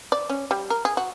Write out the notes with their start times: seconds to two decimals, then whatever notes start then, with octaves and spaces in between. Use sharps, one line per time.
0.12 D5
0.30 C#4
0.51 G3
0.70 A#4
0.85 G#4
0.97 F#4